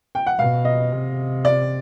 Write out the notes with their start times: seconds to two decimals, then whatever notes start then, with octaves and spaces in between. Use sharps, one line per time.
0.15 G5
0.27 F#5
0.39 B2 F5
0.65 D#5
0.91 C3
1.45 D5